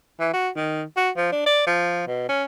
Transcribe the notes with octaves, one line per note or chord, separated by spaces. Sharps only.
E3
F#4
D#3
F#4
F3
D4
D5
F3
B2
C#4